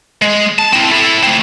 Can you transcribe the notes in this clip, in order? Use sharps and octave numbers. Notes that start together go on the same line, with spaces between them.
G#3
A5
C4 E4
E4 A4
A3 C4